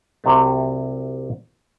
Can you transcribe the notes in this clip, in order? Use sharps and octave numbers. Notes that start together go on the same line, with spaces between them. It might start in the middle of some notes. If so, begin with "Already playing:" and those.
C2 C3 F#3 A3